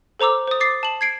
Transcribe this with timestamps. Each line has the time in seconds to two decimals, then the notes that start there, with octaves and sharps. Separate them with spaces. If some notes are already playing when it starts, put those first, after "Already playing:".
0.20 A4 C5 A#5 D6 E6
0.47 C5 D#6
0.60 D6 A6 C7
0.83 A5 F#7
1.01 G#6 C7 D7